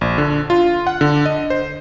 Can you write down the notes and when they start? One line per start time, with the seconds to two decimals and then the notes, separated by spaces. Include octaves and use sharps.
0.01 A#1
0.18 D3
0.50 F4
0.87 F#5
1.01 D3
1.26 D#5
1.50 C5